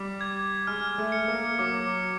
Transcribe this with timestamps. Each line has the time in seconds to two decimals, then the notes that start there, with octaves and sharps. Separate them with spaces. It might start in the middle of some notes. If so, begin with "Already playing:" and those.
Already playing: G3 D6
0.21 G#6
0.67 G#3 F6
0.98 A3
1.12 C#7
1.28 A#3
1.59 F#3 D6